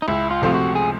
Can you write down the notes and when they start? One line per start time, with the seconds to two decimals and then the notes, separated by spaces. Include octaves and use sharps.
0.02 D#4
0.08 C#2 E4
0.31 F4
0.42 C3 F3 A3 C4 F4
0.54 F#4
0.75 G#4